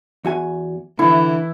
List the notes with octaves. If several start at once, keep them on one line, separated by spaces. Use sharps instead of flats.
E2 F#4 G#5
D3 E3 E4